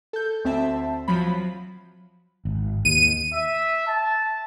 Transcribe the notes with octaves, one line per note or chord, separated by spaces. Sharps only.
A4 G6
D2 C4 E5 A5
F3 F#3 B5
G#1
D#2 D#7
E5
A5